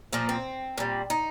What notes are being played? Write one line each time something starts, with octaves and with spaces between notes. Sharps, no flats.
A#2 F3 A#3
C4
A#2 G3
D#4